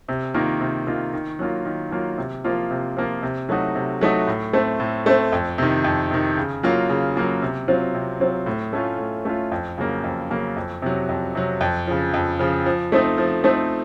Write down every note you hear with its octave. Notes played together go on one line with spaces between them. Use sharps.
C3
D#3 A#3 F4
C3
D#3 A#3 F4
D#3
F#3 A#3 F4
D#3
F#3 A#3 F4
C3
F3 A#3 F4
C3
F3 A#3 F4
C3
F#3 A3 D#4 F#4
C3
F#3 A3 D#4 F#4
A2
A3 C4
A2
A3 C4
F2
C3 D#3
F2
C3 D#3
C#3
F#3 A#3 F4
C#3
F#3 A#3 F4
C3
F#3 C4 F4
C3
F#3 C4 F4
A2
A3 C#4 F4
A2
A3 C#4 F4
F2
C#3 F#3 A#3
F2
C#3 F#3 A#3
F2
C3 F#3
F2
C3 F#3
F2
C#3 F3
F2
C#3 F3
F3
A3 C4 D#4
F3
A3 C4 D#4